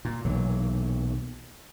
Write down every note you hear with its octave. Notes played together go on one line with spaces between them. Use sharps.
A#2
B1 A#2 E3 F#3